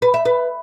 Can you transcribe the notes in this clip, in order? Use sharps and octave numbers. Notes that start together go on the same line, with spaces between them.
B4
E5
B4